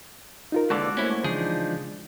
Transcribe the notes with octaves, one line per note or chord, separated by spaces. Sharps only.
D#4 F4 A#4
D#2 D3 E3 G#3 F#4 A5 D6
A3 A#3 C#4 E4 C5
C#3 E3 F3 D4 D#4 G#4